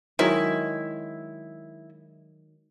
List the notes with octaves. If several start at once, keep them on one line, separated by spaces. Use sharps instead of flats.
D#3 F#3 G#3 E4